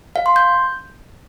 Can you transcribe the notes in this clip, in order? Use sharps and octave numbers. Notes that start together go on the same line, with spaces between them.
F5
C6
G6